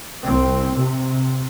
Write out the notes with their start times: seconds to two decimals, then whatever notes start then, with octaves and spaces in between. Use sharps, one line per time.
0.25 C2 C4
0.75 C3